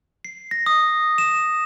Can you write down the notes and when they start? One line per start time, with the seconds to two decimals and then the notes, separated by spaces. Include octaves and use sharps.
0.25 C7
0.51 A#6
0.66 D#6
1.18 E7